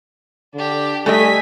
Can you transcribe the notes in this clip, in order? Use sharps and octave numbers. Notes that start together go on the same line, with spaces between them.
D3 D4 G4
G3 A3 A4 D#5 G#5 B6